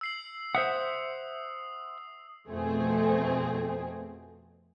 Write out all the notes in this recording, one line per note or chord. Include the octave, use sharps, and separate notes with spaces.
E6 C7 F#7
C5 E5 F#5 D#6
F2 B2 A3 C4 G#4